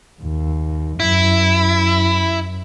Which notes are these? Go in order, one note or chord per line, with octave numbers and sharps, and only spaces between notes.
D#2
F#2 E4